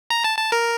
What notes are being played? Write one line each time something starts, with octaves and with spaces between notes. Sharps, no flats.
A#5
A5
A5
A#4